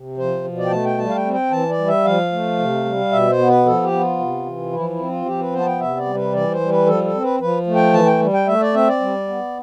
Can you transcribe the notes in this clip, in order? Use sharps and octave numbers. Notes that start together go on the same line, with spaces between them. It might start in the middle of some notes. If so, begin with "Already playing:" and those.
Already playing: C3
F3 C5
B2
D5
G5
A3 A5
G5
G3 A5
F5
G5
C4
G5
E3 A5
D5
G3
E5
F3 F5
A3
C3
G3
B2 E5
C5
B3
B4
F3 A4
G4
B3
F4
C3
E3
F3 E4
E4
C4
F4
F3 G4
B4
B3 C5
A5
G5
C3 E5
D5
G3
B4
E3 D5
C5
G3
B4
F3 A4
A4
C4
B4
F3 B4
A3
G5
E3 A5
G5
G3
G5
A3 E5
D5
C4 E5
D5
G3
B3